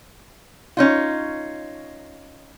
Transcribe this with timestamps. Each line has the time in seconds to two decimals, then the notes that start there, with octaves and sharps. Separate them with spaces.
0.77 C#4 D#4 F4